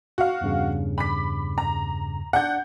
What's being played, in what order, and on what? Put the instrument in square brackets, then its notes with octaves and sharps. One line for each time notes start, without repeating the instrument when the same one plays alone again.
[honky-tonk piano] F#4 F5
[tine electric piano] E2 G2 C#3
[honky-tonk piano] B5 D6 B6
A#5
[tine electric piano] D4 D5 [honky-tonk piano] F#5 G6